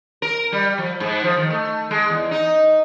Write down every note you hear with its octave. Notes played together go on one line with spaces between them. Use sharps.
A#4
G3
F3
G#2
F3
D#3
A3
G#3
E2
D#4